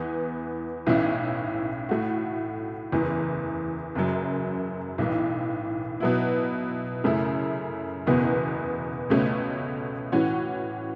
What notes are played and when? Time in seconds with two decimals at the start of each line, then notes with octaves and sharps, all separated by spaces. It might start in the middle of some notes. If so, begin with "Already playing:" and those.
Already playing: E2 E3 B3
0.86 B1 A2 E3 C#4 E4
1.89 A2 A3 F#4
2.92 F#1 E2 E3
3.95 F#1 F#2 F#3
4.98 B1 A2 E3
6.00 B2 F#3 B3 E4
7.04 F#2 C#3 A3 E4
8.07 F#1 E2 B2 B3
9.10 C#2 B2 A3 C#4
10.12 A2 E3 C#4 F#4